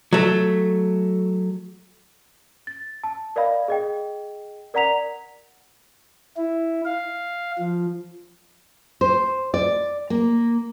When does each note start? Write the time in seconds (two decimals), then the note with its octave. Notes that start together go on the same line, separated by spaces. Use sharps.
0.13 F#3 A3
2.67 A6
3.03 A5
3.36 A#4 D5 D#5 F5 B5
3.68 G#4 D#5 G5
4.74 A#4 D5 F#5 A#5 B6 F7
6.37 E4
6.85 F5
7.59 F3
9.01 C5
9.54 D5
10.10 A#3